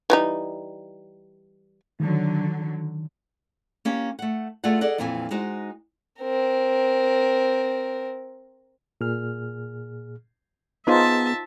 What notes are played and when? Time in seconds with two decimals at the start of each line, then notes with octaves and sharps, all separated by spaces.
0.10 E3 G3 D#4
2.00 D3 D#3 F#3
3.85 A#3 C#4 G4
4.19 A3 F#5
4.64 A3 F4 G#4 D5 F#5
4.81 G#4 A4 D5 D#5 F#5
4.98 F2 A#2 E3 C4 G5 G#5
5.31 G#3 D#4 F#4 C5
6.20 C4 A#4
9.01 A#2 G#4 F6
10.87 B3 D#4 F4 G#4 B4 C5 E5 A5